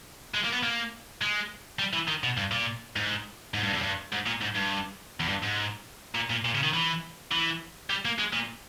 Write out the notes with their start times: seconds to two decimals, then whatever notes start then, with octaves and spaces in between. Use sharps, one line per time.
0.35 G#3
0.44 A#3
0.53 B3
0.63 A#3
1.21 G#3
1.79 G3
1.93 E3
2.08 D#3
2.24 B2
2.37 G2
2.51 A#2
2.96 G#2
3.54 G#2
3.63 G2
3.73 E2
3.82 G2
4.12 G#2
4.26 A#2
4.41 G#2
4.55 G2
5.20 E2
5.29 G2
5.43 G#2
6.15 A#2
6.30 A#2
6.45 A#2
6.55 C#3
6.63 D#3
6.74 E3
7.32 E3
7.90 G3
8.05 A#3
8.19 G#3
8.33 A#2